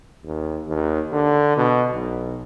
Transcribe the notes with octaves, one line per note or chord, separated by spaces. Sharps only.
D#2
D#2
D3
B2
B1